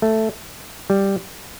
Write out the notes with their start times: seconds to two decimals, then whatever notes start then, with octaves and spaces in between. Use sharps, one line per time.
0.02 A3
0.90 G3